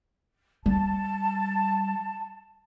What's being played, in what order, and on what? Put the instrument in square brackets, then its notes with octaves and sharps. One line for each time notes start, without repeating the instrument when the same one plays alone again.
[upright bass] G3 [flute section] A5